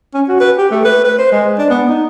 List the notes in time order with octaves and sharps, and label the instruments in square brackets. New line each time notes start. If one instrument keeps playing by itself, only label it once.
[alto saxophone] C#4
F#4
B4
G4
A3
B4
B4
C5
G#3
D4
B3
D#4